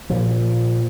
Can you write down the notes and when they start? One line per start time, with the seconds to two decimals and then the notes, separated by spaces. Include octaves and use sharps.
0.10 A#2 F3